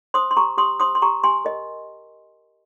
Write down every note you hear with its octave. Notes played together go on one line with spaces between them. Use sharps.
C5 C6 D#6
C6
G4 A#5 C#6
G4 C6 D#6
C5 C6 D#6
C6
G4 A#5 C#6
G4 G#5 C6
A#4 D#5